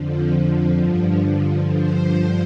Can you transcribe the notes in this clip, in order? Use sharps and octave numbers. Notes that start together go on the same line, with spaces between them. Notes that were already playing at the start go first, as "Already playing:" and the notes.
Already playing: F2 D3 F3
G2 D3 F3
G2 D3 F3 C5